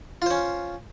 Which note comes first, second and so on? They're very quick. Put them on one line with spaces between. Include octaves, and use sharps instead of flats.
F4 C5 C#4